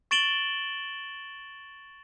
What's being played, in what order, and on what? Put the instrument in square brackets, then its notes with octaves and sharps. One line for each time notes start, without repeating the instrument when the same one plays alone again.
[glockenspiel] C#6 A6 D7 E7 F#7 G7